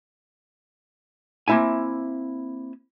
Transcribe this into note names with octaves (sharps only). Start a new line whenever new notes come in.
A#3 C4 E4 E5 G#5